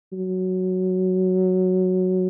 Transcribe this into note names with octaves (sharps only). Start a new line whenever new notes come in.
F#3